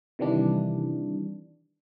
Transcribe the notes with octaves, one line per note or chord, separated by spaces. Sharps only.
C3 D#3 E3 G3 D4